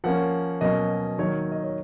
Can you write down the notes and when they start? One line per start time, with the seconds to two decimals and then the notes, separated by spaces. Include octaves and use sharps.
0.04 F3 A#3 C#4 F#5
0.61 B2 F#3 A#3 C#4 D#5
1.18 D#3 F#3 A#3 C#5
1.52 D#5
1.64 C#5